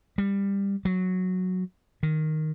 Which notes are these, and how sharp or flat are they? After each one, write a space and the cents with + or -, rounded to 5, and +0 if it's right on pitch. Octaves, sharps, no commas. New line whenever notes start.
G3 +20
F#3 -5
D#3 +0